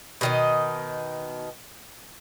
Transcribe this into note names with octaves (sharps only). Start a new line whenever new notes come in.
B2 D#3 D#5